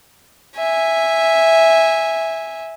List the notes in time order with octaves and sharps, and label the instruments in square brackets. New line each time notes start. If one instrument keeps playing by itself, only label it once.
[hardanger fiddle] E5 G#5